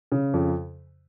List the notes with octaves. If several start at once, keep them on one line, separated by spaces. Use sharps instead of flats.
C#3
F2